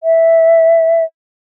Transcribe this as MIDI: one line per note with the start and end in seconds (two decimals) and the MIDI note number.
0.03 1.04 76